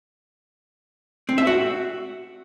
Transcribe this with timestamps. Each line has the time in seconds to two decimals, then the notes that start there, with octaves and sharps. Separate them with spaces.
1.29 C4
1.38 E5
1.47 F#4